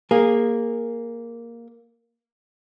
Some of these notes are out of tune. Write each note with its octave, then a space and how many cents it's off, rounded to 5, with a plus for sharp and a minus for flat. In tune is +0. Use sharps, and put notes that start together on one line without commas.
A#3 +0 G#4 -15